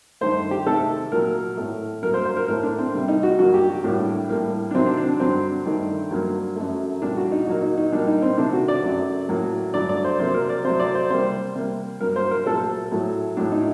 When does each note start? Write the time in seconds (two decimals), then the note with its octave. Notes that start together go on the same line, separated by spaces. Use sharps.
0.21 G2 D#3 A3 C5
0.51 G4
0.66 C3 D#3 A3 A4
1.12 A#2 F#3 A#3 A#4
1.57 A2 A3
2.02 G2 F#3 A#3 A#4
2.14 C5
2.25 C5
2.37 A#4
2.48 A2 A3 A#4
2.63 D4
2.79 C4
2.93 C3 G3 A#3
3.08 D#4
3.23 F#4
3.39 G2 F#3 A#3 F#4
3.54 G4
3.69 F#4
3.84 A2 G3 A#3 D4
4.29 A2 G3 A#3
4.71 D4
4.75 C3 D#3 F#3 C4
4.86 D4
4.97 D4
5.09 D4
5.20 G2 D3 F#3 C4
5.65 G2 D#3 A3
6.11 G2 F#3 A#3
6.56 F#2 F#3 A3
7.02 A#2 G3 A#3 D4
7.17 F#4
7.32 D#4
7.47 A#2 F#3 A#3 F#4
7.62 D#4
7.78 D#4
7.92 A#2 G3 A#3 D4
8.07 D#4
8.22 C4
8.38 C3 D#3 A3 D4
8.53 F#4
8.68 D5
8.83 F#2 F#3 A3
9.28 A2 F#3 A#3
9.73 G2 D3 F#3 A3 D5
9.89 D5
10.04 C5
10.19 C3 F#3 A#3 C5
10.34 A#4
10.49 D5
10.64 C3 F#3 A3 C5
10.80 D5
10.95 C5
11.10 C3 G3 A#3 C5
11.55 C3 G3 A#3
12.01 G2 F#3 A#3 A#4
12.16 C5
12.31 A#4
12.46 A#2 F#3 A3 A4
12.92 A2 F#3 A3
13.37 A2 F#3 A3 D4
13.52 D#4